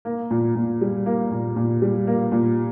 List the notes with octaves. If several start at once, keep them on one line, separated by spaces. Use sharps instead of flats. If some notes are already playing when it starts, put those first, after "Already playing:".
A#3
A#2
A#2
G3
A#3
A#2
A#2
G3
A#3
A#2